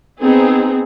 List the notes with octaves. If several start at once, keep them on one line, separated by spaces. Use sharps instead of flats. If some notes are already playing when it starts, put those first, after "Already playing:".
B3 C4 D#4 G#4